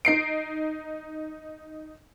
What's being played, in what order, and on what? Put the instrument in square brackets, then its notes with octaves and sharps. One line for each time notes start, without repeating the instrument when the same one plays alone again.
[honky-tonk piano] D#4 C7 D7